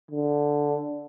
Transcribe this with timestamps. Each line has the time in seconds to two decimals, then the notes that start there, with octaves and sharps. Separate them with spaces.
0.11 D3